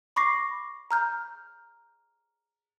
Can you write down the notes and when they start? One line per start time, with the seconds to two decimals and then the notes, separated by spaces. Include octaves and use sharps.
0.16 B5 C#6 D6 A#6 C7
0.91 A#5 F6 G6